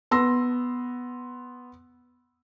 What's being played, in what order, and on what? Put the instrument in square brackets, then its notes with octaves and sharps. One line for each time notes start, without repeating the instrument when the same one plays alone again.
[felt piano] B3 C6 E6 A#6